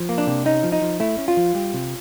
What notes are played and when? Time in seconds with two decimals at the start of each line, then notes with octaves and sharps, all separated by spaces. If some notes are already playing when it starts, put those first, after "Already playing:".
Already playing: F3
0.09 A#3
0.18 D4
0.27 C3
0.46 C#4 D#4
0.63 F3
0.72 D#4
0.82 F3
1.00 A3 E4
1.18 C#4
1.28 F4
1.37 F3
1.55 G3
1.74 C3